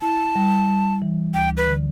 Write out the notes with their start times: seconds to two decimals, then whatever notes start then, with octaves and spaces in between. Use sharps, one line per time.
0.01 E4 A5
0.35 G3
0.68 G3
1.02 E3
1.34 D2 G5
1.57 B4
1.67 D3